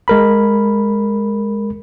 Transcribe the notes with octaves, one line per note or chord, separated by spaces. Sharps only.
G#3 A#4 B5